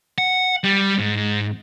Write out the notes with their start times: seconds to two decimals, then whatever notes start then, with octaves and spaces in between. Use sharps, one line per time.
0.18 F#5
0.64 G3
0.98 G#2